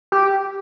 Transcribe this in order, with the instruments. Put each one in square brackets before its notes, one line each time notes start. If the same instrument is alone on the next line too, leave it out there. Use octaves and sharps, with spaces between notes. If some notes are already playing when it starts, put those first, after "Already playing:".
[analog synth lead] G4